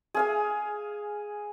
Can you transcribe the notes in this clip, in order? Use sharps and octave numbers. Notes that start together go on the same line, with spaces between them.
G#4 F5 G#5